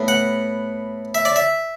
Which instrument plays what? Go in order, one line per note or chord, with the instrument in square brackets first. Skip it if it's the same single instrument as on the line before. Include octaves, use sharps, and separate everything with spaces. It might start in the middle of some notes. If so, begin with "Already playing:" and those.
Already playing: [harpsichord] A2 B3
F#5
E5
D5
E5